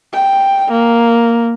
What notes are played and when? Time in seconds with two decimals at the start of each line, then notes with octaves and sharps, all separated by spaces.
0.13 G5
0.71 A#3